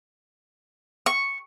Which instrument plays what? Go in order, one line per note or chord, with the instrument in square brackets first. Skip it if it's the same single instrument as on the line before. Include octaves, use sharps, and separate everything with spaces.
[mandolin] C#6